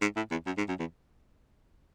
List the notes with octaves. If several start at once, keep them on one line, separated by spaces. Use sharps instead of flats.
G#2
A2
E2
F#2
G#2
F#2
E2